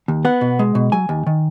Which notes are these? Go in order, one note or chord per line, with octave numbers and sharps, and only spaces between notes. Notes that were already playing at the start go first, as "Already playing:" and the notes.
D#2
B3 F#5
B2
G#3
B2
F#3 G#5
D#2
D#3